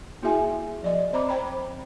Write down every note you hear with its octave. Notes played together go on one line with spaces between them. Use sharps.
A#3 E4 F#4 G#4 E5 G#5
F3 D5 D#5
C4 C5 A#5 B5 D6
C5 G5 A#5 B5